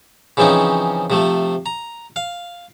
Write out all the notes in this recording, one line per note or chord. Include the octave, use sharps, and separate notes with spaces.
C#3 E3 F3 C4 C#4 D#4
C3 F3 A3
A#5
F5